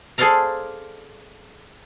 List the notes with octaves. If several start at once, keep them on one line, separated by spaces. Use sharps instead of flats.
G#4 A4 C5 D5 F5 A#5